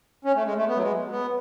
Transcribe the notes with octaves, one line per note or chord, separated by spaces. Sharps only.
C#4
A3
G#3
A3
B3
F#3
G#3
B3